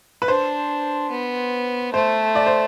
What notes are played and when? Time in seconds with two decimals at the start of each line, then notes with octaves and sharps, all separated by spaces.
0.22 B4
0.28 D4 C5
1.10 B3
1.93 A3 C5
2.35 D5
2.46 C5